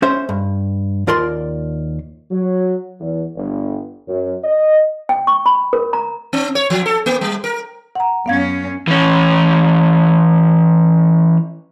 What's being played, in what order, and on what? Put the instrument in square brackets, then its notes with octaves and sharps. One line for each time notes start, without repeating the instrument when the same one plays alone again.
[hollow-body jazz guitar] C#4 C5 E5
G2
D#2 F4 A#4 D5 C6
[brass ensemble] F#3
E2
G1
F#2
D#5
[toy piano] G5
C#6
B5
A#4
A#5
[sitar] C4
C#5
F3
A4
A#3
G3
A#4
[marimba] F#5 A#5
[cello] F#2 C#4 [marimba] B3 F5 G#6
[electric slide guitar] E3 C#4